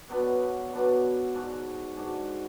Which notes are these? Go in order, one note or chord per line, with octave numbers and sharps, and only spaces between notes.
B2 F#3 B3 D4
B2 F#3 B3 D4
G#2 G#3 D4 F#4
G#2 G#3 D4 F#4